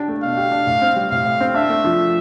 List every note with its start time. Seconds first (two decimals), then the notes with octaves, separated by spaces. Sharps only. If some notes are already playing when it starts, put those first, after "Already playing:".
Already playing: D4 G4
0.08 A3
0.22 B2 F5
0.37 G4
0.52 D4
0.67 A2
0.82 C4
0.96 G3
1.11 A2 F5
1.25 A2
1.40 C4
1.55 D4 E5
1.69 A3
1.84 F3